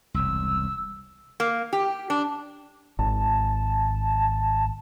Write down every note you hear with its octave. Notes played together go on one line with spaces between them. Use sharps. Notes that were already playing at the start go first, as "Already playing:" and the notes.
E1 C2 E6
A#3
G4
D4
G#1 A5